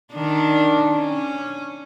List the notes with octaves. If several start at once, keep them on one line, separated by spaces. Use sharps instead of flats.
D#3 D4
C#4